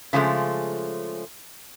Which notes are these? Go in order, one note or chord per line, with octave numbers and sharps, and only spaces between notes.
C#3 F3 G#3 A3